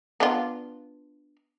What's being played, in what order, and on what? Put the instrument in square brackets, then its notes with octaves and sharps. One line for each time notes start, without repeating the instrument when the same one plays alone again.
[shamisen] B3 D4 F4